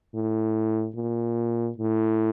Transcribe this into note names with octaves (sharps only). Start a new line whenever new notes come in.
A2
A#2
A2